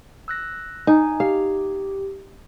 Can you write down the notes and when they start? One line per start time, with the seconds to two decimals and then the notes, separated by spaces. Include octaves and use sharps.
0.28 E6 F#6 A#6
0.87 D#4 G#5
1.20 G4 F5